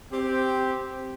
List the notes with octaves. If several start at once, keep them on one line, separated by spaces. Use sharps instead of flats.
C4 G4